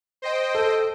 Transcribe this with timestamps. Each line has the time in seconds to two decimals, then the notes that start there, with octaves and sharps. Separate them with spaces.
0.22 C5 D#5 G5
0.55 A4